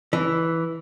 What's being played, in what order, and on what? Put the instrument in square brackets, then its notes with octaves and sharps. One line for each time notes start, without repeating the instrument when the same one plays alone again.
[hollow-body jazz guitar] E3